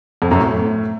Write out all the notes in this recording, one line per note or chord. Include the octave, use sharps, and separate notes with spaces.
F2
F#2
A2